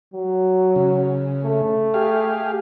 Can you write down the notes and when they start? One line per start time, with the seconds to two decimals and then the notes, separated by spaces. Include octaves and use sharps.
0.14 F#3
0.76 C#3
1.44 A3
1.94 G4 G#4 F5